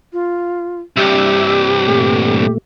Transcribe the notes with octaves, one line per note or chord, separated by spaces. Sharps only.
F4
C2 G2 G4 E5
A#2 A3